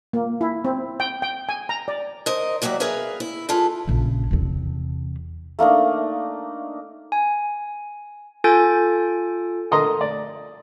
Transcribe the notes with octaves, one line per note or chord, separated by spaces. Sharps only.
A#3
E4
C4
G5
G5
G#5
A#5
D5
A#4 C5 D#5
D#2 F#3 G3 A#3 E5
G#4 A#4 B4 E5 F5
E4
F4 G#4 A4 B4
A#1 C#3
E2 C3
A3 A#3 D4 D#4
G#5
F4 A4 G#5 G6 A6 D7
D3 A#4 D#5 A#5 C6
D5